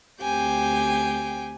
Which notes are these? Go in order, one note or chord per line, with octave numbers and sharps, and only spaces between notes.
D2 C4 G4 G5 G#5